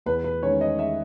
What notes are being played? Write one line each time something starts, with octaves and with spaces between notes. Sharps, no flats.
E2 B4
B4
D#3 G#3 C#4 C#5
D#5
E5